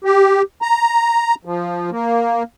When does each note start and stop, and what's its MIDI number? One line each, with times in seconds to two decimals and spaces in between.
0.04 0.42 67
0.62 1.35 82
1.45 1.90 53
1.91 2.43 58